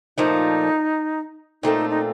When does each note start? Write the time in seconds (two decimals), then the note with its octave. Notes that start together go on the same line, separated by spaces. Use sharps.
0.18 A#2 F3 A3 D#4
1.63 A#2 A3 C4 D#4 F4
1.90 D#4